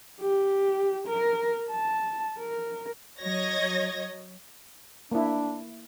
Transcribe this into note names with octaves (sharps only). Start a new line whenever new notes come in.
G4
A#4
A5
A#4
F#3 C#5 D#5 G#6 A#6
A#3 D4 E4